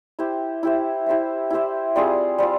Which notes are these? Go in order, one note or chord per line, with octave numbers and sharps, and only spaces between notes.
E4 G4 C5 E5
E4 G4 C5 E5
E4 G4 C5 E5
E4 G4 C5 E5
G3 C4 F4 G#4
G3 C4 F4